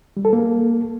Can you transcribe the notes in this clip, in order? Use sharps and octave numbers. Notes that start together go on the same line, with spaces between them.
G3
A4
A#3